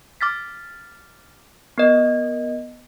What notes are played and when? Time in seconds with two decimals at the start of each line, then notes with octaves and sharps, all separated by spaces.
0.21 D6 F6 A6 B6
1.78 B3 A#4 D#5